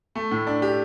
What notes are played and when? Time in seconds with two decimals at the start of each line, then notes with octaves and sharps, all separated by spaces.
0.15 A3
0.31 A2
0.47 D4
0.62 G4